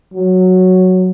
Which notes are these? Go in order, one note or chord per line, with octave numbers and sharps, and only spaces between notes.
F#3